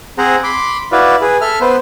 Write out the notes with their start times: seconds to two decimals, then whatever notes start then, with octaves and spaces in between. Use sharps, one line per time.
0.18 C4 G#4 C5 F#5 A#5
0.44 B5 C6 D6
0.92 E4 F#4 B4 D5 F5
1.21 G#4 B4
1.41 A4 E5 F6
1.61 B3 B4 C5